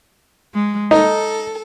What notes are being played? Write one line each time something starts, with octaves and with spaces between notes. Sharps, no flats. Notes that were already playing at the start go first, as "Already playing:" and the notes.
G#3
D#4 A4